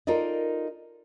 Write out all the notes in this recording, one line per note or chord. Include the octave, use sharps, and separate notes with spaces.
D#4 F4 A4 A#4 D5 D#5